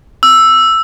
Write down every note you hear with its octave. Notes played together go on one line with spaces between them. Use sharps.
E6